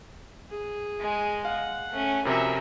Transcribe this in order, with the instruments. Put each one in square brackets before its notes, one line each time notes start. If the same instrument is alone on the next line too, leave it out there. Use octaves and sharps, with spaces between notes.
[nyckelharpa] G#4
[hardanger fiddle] G#3
[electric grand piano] F5 [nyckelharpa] F#5
[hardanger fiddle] A3 C#4
[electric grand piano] F2 C3 [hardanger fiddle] C#4 F#4 [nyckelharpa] A#4 E5